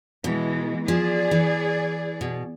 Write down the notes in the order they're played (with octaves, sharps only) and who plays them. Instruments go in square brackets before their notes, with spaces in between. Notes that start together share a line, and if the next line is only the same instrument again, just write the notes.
[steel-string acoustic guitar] B2 [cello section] E3 G#3
[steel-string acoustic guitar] F3 [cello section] G#4 D5
[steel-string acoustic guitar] E3
B2